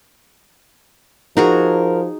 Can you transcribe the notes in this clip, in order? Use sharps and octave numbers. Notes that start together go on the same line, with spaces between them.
F3 D#4 F#4 G#4 A#4